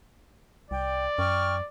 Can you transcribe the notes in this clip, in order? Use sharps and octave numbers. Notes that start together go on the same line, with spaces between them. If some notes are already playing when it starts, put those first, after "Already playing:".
C2 D5 G5
F#2 G5 C#6 F6